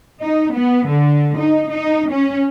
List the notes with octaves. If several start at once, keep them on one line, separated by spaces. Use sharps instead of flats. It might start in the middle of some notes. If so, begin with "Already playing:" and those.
D#4
B3
D3
D#4
D#4
C#4